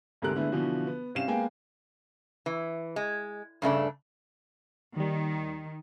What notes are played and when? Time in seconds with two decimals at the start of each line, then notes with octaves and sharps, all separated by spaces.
0.22 D2 G#2 C3 A4 A#4 F#6
0.36 D3 G#3 A3 B3 E4
0.52 B2 D3 E3 F3 F#4
0.87 B3
1.15 C2 C4 C#4 F5 E7
1.28 G#3 A#3 B3 F5 G5 G#5
2.46 E3
2.96 G#3
3.62 G2 C#3 A3 D4
4.96 D#2 D#3 G3